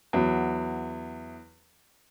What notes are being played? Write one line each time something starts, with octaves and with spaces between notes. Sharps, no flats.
E2 F#3